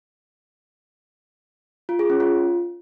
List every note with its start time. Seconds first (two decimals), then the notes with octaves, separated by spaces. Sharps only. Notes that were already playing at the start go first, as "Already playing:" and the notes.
1.89 F4
1.99 G#4
2.10 C#4
2.20 F4